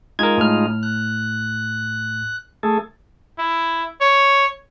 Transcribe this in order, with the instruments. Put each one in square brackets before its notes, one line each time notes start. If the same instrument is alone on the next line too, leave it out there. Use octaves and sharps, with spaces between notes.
[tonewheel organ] G#3 D#4 F4 [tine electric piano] A#4 G#6
[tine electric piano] A2 F6
[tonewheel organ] F#6
A3 G#4 A4
[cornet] E4
C#5